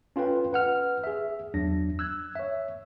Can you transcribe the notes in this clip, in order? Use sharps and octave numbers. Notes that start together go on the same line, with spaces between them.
C#4 F4 A4 B4 G5
B4 F#5 F6
G#4 E5
E2 F#3 D4 A#6
E6 F#6 G#6
C#5 E5